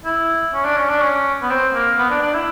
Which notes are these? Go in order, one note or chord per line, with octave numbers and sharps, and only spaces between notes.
E4
C#4
D4
C#4
D4
C#4
B3
C4
A#3
B3
D4
D4
E4